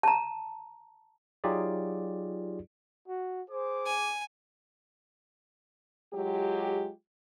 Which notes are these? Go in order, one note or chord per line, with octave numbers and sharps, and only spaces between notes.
A5 A#5
F#3 D#4 F4 G4 G#4 D5
F#4
G#4 C5 D6
G#5
F#3 G#3 F4 G4